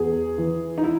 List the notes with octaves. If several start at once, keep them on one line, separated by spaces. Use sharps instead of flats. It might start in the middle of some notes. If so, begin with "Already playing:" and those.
Already playing: E2 G#4
E3
D#4
E4